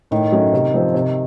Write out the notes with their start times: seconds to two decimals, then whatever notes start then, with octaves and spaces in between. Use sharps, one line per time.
0.11 A2 D#3
0.32 F#3 A3 C#4
0.53 C3
0.74 F3 C4
0.94 C3